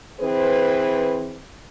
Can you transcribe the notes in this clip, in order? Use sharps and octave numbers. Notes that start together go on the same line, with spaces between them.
E3 C4 G#4 B4 C5